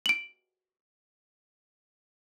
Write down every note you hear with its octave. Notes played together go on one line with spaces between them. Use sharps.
D7 F#7